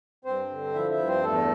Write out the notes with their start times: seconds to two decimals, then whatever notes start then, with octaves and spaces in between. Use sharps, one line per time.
0.25 G2 C4 C5
0.50 D3
0.74 F3 E4 E5
0.91 E4 E5
0.99 G2
1.07 C4 C5
1.24 E2 A3 A4